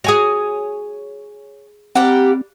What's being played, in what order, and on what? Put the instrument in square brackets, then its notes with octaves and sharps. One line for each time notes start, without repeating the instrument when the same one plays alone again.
[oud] F#4 G#4 [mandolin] C#5 G#5 D#6
[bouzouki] G3 A#3 G4 [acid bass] C4 [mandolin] F#5